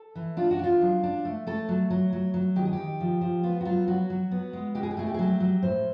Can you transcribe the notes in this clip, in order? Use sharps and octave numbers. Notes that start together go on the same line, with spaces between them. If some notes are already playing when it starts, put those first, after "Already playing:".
Already playing: A4
E3
D4 F4
F#4
D4 F4
F#3
D4
A3
A3 A4
F#3
F#3
F#3
F#3
D#3 G4
G#4
D#3 G4
F3
F3
B3 F4
F#4
F#3 F4
F#3 F#4
F#3
B3
G#3
B2 G4
G#4
G4
A3 G#4
G4
G#4
F#3 G4
F#3
A2 C5